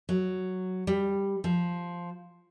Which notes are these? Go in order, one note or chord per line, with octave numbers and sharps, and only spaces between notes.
F#3
G3
F3